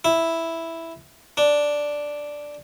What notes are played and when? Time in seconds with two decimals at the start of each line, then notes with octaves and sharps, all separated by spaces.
0.05 E4
1.37 D4